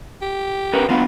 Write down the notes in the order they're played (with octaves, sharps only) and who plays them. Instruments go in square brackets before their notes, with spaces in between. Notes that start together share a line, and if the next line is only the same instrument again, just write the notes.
[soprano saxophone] G4
[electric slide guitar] C#4 A#4 B4
[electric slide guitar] F#3 B3 D4 [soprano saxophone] F4